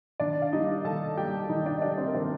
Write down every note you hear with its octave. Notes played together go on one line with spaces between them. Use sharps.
D#3 D4 D5
F5
G3 A#3 D#4 D#5
D#3 A4 A5
G3 A#3 G4 G5
D#3 D#4 D#5
D4 D5
D#5
G3 A#3 D4 D5
C4 C5
A#4
D#3 C4 C5